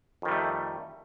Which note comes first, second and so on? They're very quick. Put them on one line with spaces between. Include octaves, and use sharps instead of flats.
F2 D#3 G3 A3